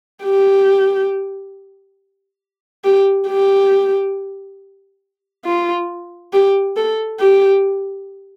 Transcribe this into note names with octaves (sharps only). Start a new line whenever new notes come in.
G4
G4
G4
F4
G4
A4
G4